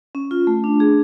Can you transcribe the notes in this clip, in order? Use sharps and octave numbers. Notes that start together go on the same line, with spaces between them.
C#4
F4
A3
D4
G#4